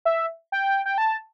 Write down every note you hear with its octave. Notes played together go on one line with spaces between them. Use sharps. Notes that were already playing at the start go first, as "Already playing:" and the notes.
E5
G5
G5
A5